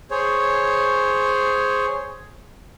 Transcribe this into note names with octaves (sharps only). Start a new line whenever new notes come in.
G#4 C5 C#5